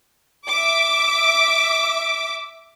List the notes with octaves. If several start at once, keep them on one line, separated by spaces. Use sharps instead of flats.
E5 D6